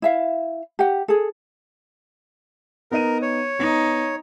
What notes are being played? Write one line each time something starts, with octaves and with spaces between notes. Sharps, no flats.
E4 E5 F5
G4 F#5
G#4 A4
B3 D#4 A#4 D#7
C#5
B3 D#4